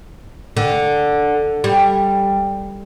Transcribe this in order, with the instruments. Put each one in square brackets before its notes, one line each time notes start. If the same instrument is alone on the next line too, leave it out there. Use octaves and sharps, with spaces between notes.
[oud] D3
G3